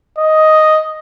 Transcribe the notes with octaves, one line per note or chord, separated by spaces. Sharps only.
D#5